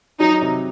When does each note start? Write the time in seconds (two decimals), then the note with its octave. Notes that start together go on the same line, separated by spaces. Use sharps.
0.20 F#3 D#4
0.42 C3